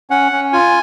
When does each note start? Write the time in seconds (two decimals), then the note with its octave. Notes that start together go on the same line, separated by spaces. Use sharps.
0.10 C#4 F#5
0.32 C#4
0.53 F4 G#5